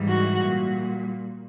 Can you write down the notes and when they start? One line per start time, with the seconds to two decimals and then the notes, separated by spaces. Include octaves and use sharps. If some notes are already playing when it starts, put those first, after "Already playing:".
Already playing: G#2 E3 G3
0.09 F#4
0.40 A#2 G3